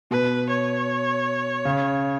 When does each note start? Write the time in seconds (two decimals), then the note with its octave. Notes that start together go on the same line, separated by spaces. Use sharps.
0.11 B2 B4
0.50 C#5
1.65 C#3